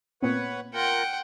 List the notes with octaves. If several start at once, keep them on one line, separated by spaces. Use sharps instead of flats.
A#2 B3 C4 B4 C#5 F#5
F4 A#4 F#5 G5